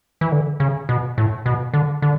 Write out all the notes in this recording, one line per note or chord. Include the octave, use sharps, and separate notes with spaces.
E3
D3
C#3
B2
A2
B2
D3
D3